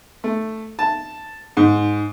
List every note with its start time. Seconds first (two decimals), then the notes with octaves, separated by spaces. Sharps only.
0.24 A3
0.79 A5
1.57 G#2